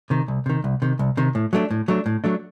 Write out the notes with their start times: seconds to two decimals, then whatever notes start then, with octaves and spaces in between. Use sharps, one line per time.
0.10 C3 D#3
0.28 C2
0.46 C3 D#3
0.64 C2
0.82 C3 D#3
0.99 C2
1.17 C3 D#3
1.35 A2
1.53 F#3 A3 D4
1.71 A2
1.88 F#3 A3 D4
2.06 A2
2.24 F#3 A3 D4